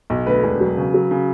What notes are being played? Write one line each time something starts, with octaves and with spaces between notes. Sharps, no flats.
B1
D2 B4
E1
F#3
C#3
F#3
C#3